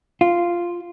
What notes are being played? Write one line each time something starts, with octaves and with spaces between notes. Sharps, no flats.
F4